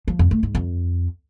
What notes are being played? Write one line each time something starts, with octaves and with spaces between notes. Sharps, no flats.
F3
F2
A3
G#2
F2